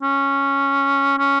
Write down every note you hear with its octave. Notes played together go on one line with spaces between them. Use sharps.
C#4
C#4